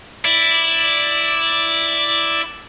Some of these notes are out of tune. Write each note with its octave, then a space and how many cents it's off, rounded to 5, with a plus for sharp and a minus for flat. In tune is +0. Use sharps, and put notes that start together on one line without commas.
E4 +0 D5 +0